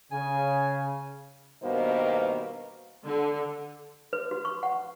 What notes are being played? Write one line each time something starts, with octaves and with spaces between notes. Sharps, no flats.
C#3 G#5
G2 B2 D#3 A#3 B3 C5
D3
B4
F#4
C#6
F#5